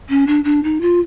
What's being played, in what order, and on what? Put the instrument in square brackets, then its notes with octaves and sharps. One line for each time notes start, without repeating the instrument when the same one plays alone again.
[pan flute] C#4
D4
D4
D#4
F4